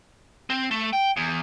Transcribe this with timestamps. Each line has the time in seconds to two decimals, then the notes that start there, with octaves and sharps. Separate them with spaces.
0.50 C4
0.71 A3
0.93 G5
1.17 E2